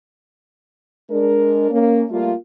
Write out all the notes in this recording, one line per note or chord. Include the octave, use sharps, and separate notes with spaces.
G#3 D4 A#4
A#3 C#4
G3 A3 A#3 F4